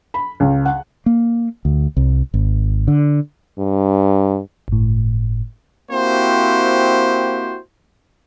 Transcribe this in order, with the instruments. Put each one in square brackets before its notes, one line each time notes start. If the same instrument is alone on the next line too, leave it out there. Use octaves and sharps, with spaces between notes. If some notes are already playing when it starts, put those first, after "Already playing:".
[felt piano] B5
C#2
F#5
[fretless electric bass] A#3
D2
C2
G#1
D3
[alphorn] G2
[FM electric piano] G1 A2
[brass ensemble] A#3 C4 E4 F#4 G4 C5